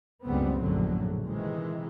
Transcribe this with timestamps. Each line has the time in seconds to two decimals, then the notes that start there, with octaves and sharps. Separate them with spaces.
0.25 F#1 C#2 G#2 G3 B3 C4
0.60 A#1 F#2 A2 D3 F#3
1.24 C3 D#3 E3 G#3